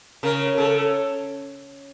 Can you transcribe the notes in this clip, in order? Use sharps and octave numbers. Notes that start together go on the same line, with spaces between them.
C#3 A#4
C#3 A4